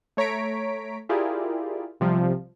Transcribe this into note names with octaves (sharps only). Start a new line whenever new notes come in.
A3 C#5 A#5 B6 D7
E4 F4 G4 G#4 A#4 D5
B1 C3 F3 G3